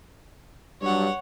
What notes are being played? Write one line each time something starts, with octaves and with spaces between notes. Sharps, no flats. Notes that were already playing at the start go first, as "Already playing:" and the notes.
G2 F#3 C#5 F#5